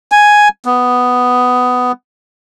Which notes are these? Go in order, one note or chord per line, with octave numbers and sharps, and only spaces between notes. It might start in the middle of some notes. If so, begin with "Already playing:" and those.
G#5
B3